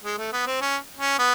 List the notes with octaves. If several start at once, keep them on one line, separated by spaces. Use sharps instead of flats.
G#3
A3
B3
C4
C#4
C#4
B3